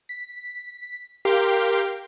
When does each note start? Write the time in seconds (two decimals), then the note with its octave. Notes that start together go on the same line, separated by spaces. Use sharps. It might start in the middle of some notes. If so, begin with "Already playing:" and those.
0.09 B6
1.25 G4 A#4 F5 G5 C6